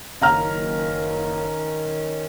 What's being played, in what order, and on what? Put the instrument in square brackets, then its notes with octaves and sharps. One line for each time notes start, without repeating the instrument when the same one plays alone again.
[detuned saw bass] F#1 [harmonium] D#3 C#4 [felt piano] F5 A#5 F6